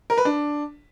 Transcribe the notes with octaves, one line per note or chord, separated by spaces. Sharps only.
A#4
B4
D4